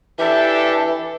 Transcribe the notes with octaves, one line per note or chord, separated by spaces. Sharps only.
E3 D4 G4 A4 E5